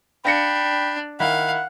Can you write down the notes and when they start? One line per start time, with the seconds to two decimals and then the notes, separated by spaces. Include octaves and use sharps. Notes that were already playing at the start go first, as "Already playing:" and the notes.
0.25 D4 F5 G5 B5 A#6 C#7
1.20 D#3 E4 F5 F#5